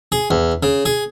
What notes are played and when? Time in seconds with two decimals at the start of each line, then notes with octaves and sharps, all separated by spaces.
0.12 G#4
0.31 E2
0.63 C#3
0.86 G#4